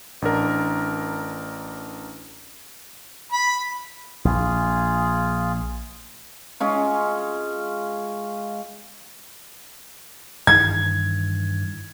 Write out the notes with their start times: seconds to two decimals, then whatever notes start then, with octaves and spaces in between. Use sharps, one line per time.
0.22 A1 D4 A#4
3.32 B5
4.25 A#1 F4 G#4
6.60 G#3 C#4 F4
10.47 G2 D#3 E3 G#6